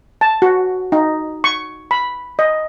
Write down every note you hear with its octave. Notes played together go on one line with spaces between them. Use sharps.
A5
F#4
D#4
C#6
B5
D#5